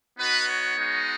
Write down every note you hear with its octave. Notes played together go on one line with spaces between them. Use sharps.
B3 D#4 F#4 B4
C#5
G#3 B3 D#4 F#4